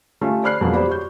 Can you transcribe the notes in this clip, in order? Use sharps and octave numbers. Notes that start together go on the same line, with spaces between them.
A3 C#4 F4 G4
C5 D5 B5 F6 F#6 C7
F2 B2 F#3 G#3 A#3 B3
G4 C5 D5 B5
F#4 C#5 G6